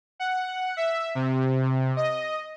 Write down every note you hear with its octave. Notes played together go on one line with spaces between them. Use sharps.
F#5
E5
C3
D#5